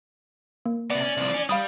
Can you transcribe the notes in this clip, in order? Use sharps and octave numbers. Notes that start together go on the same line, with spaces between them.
A#3
C3 B3 D5
C#4
C2 F3
C#4
G3 F5 B5 D#6